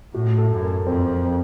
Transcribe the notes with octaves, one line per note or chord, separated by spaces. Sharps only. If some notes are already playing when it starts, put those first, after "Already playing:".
A2 F#4
A4
F#2
A#4
F2 C4